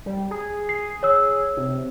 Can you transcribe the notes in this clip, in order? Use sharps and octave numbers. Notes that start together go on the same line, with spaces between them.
G3
G#4
C7
C#5 E6
C3